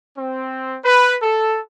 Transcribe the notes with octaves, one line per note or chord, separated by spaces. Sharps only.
C4
B4
A4